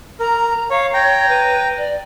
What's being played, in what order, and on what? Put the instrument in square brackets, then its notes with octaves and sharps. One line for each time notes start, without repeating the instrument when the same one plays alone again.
[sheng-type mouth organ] A#4 [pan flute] A#5
[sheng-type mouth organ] C#5 [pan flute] F5
[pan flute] C#5 [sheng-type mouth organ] G5 A#5
[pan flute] B4
D5